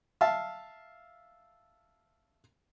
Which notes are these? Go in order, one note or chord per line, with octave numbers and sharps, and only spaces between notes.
E5 F5 A5